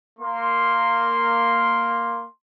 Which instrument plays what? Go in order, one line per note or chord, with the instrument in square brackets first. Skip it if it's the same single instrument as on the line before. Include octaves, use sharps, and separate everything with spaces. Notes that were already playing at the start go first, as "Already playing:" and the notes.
[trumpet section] A#3 C6